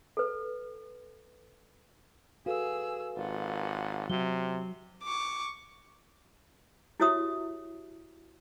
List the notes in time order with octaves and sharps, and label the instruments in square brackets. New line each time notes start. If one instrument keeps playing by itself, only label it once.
[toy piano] A4 B4
[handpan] F#4 [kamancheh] G#4 E6 [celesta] A4 B4 F5
[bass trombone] G#1 [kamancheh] F4 F#5
[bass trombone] C3 [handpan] F#3 F#4 [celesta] G7
[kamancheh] C#6 D6
[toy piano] E4 F#4 G4 C#5 E5 D#6